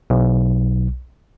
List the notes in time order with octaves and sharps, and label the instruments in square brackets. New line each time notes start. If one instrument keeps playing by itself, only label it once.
[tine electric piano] B1